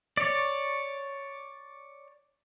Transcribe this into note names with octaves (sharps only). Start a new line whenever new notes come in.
C#5 D5